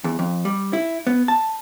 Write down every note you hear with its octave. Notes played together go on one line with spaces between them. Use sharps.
E2
F2
G3
E4
B3
A5